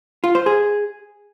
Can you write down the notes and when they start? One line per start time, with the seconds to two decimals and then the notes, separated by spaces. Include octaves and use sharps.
0.24 F4
0.35 C5
0.46 G#4